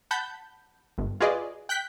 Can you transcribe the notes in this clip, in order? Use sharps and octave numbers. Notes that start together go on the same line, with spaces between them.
F#5 A5 B5 G6
G1
F4 F#4 G#4 B4 D5 D#5
G5 F#6 G6 B6